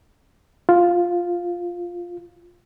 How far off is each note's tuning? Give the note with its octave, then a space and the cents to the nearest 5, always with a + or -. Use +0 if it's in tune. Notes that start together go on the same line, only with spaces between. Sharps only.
F4 +0